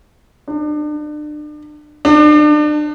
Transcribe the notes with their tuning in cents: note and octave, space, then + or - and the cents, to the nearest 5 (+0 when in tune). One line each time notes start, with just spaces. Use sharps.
D4 +35
D4 +35